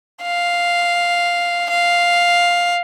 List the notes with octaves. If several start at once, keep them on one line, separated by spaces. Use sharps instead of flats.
F5
F5